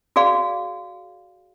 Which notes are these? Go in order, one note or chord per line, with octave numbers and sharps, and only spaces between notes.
F#4 G#4 D5 F5